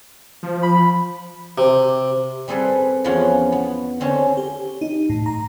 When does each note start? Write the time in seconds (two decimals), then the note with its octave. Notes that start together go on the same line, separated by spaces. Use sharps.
0.43 F3
0.63 B5
1.58 C3
2.48 G3 C4 G#4 A4 B4
3.04 E2 F3 B3 C#4 F4 F#5
3.52 B3
4.00 D3 C4 C#4 A5
4.37 G4
4.81 D#4
5.09 A2
5.26 A#5